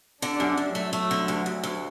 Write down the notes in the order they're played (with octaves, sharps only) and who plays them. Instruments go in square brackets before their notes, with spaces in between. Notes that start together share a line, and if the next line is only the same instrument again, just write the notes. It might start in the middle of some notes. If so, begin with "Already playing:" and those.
[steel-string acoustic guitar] D3 [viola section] D4
[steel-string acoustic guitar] F#2
F#2
[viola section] F#3 [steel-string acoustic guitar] A3
[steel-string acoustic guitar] A3
D3
D2
D2
D2